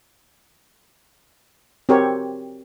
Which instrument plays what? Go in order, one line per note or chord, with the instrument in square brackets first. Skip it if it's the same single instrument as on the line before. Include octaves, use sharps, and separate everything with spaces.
[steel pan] C4 F#4 G4 A#4 C#5